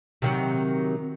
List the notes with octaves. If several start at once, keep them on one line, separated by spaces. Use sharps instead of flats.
C3 D#3 F#3